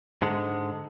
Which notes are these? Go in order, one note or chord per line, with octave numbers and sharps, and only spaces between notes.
G#2 D3 G#3